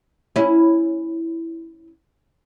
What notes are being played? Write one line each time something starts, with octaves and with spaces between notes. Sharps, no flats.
C#4 E4